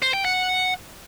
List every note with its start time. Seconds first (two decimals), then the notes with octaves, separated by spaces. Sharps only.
0.02 C5
0.14 G5
0.25 F#5